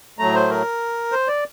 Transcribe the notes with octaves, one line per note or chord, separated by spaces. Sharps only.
A2 F#3 A3 A#5
C5
A#4
C5
D5